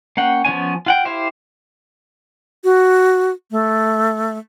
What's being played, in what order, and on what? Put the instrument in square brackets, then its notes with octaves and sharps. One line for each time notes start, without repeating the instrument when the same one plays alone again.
[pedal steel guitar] A#3 C#4 F#5 G5
F3 B3 C#4 G#5
F4 F#5 G5
E4 G4 C5 F5
[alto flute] F#4
A3